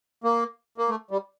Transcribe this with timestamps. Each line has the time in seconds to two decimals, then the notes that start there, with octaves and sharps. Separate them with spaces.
0.24 A#3
0.78 A#3
0.89 A3
1.11 G3